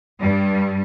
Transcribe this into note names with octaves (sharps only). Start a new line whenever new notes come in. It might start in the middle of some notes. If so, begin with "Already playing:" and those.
G2 G3